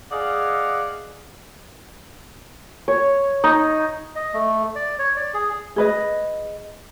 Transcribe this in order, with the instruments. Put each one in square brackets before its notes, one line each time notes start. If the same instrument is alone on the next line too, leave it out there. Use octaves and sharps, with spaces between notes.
[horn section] G#4 D5 D#5 F5 F#5
[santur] C#5
D#4
[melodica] D#5
A3
D5
C#5
D5
G#4
[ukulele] G#4 B4 D#5